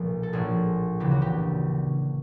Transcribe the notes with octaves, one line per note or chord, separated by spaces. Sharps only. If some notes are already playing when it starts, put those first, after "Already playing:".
Already playing: B1 A#2 F3
A4
A#1 A2 F3 G#4
D2 C#3 E3 G4
F#4
G4